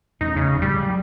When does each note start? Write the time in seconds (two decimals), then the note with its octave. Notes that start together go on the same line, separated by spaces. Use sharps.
0.21 E2 A3 C#4 D#4
0.36 C#3
0.49 F1
0.62 C#2 A2 G3
0.80 F#3